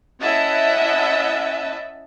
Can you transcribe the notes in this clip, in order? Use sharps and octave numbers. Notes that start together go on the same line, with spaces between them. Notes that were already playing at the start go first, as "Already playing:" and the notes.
C#4 E4 D#5 E5 F#5 A5